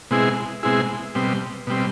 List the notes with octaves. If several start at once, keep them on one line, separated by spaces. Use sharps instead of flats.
B2 G#3 C4 E4 G#4
B2 G#3 C4 E4 G#4
B2 G3 C4
B2 G3 C4